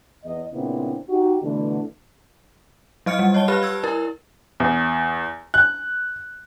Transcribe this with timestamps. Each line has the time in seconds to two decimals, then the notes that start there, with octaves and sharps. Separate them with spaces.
0.25 E2 D#5
0.53 A#2 C#3 B3 C4 D4 E4
1.09 D#4 F#4 G4
1.43 B2 D3 E3 A3 D4
3.06 F#3 D#5 F6 C#7
3.19 G3
3.34 C#5 D#5 A5 G7
3.48 G4 B4 B5 F6
3.63 E6 G#6
3.84 E4 A#4
4.60 E2
5.54 F#6